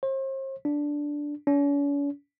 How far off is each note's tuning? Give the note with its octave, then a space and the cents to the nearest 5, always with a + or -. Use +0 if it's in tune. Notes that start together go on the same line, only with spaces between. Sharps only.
C5 +40
D4 -5
C#4 +45